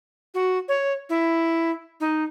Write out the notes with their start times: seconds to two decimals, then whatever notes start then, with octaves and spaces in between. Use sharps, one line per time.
0.34 F#4
0.69 C#5
1.09 E4
2.00 D#4